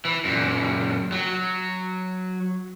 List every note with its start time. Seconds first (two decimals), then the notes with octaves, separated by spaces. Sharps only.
0.05 E3
0.25 F#2 A#2
1.12 F#3